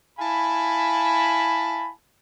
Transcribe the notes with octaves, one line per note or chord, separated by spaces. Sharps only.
E4 F5 G#5 A5 B5